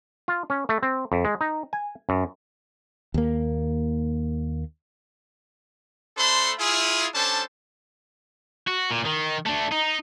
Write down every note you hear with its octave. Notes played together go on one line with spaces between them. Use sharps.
F4
C#4
A3
C4
F2
G#3
D#4
G#5
F#2
D#2 A#3
A3 D4 A4 C5 B5 C6
E4 F4 G#4
G3 C#4 D4 A4 C5 A5
F#4
A#2
D#3
A3 D4
D#4